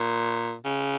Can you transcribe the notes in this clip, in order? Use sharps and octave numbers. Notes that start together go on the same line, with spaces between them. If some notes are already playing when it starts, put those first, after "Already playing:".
Already playing: A#2
C#3